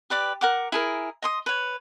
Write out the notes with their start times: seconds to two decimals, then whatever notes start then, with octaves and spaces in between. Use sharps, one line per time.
0.10 G4 B4 D5 D6
0.41 A#4 F#5 D6
0.72 E4 G#4 A#4
1.22 D#5 C6 D#6
1.46 B4 C#5